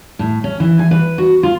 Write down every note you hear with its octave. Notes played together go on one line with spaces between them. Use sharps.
A2
C#4
E3
G#5
B4
F#4
F4